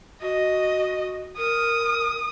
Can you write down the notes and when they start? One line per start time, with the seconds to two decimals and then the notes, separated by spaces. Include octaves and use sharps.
0.21 F#4 D#5
1.37 A#4 D#6